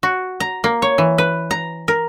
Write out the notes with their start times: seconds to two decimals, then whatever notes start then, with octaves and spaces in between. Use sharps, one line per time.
0.03 F#4
0.40 A#5
0.64 A#3
0.82 C#5
0.98 E3
1.18 B4
1.51 A#5
1.88 A#4